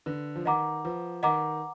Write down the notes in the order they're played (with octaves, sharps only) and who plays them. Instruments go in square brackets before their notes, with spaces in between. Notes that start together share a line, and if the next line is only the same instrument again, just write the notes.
[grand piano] D3 [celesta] B4
[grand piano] F3
[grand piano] D#3 [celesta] D#5 F#5 A#5 D6
[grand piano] F3 [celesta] B4
[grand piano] D#3 [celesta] D#5 F#5 A#5 D6